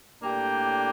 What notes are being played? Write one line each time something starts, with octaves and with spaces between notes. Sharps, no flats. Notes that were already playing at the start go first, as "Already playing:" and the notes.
A2 G3 A#3 D4 G5